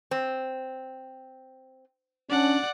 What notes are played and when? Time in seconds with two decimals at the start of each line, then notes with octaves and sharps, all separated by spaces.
0.11 C4
2.30 C#4 D4 D5 F#5